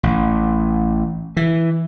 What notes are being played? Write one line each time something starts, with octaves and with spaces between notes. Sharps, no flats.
A1
E3